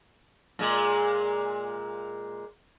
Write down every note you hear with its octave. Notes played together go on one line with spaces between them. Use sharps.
A#2 G#3